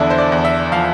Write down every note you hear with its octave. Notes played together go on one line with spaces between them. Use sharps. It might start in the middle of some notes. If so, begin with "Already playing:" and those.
Already playing: E2 D3 F3 D4 E4
C5
D5
E2
E5
F3 F5